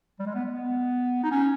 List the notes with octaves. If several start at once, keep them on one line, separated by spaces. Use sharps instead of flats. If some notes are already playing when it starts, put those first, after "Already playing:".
G3
G#3
B3
B3
D#4
C#4